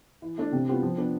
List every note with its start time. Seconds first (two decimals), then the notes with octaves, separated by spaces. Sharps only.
0.22 E3
0.38 A3 D4
0.52 C3
0.68 E3 G3 B3 F4
0.82 F3
0.98 B3 D4